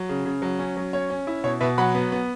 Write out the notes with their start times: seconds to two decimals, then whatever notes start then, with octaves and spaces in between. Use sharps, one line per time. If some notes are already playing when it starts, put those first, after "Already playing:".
Already playing: F#3
0.09 C#3
0.26 C#3
0.42 F#3
0.59 C#4
0.77 F#3
0.93 C#4 C#5
1.10 C#4
1.27 E4
1.44 B2 C#5
1.60 B2 B4 E5
1.78 F#3 F#5 B5
1.95 B3
2.12 B3